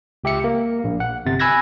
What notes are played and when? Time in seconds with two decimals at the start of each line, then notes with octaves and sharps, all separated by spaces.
0.24 C#2 G4 E5 C#7
0.44 A#3
0.84 A#1
1.00 F#5
1.26 G1 C3 A6
1.40 G#5 B5 E6 F#6 G#6 A#6